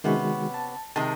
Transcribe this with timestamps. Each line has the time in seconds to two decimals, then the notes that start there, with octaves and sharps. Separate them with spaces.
0.04 C3 D#3 G#3 B3 C#4 F#4
0.54 A5
0.96 C3 D#3 G#3 A5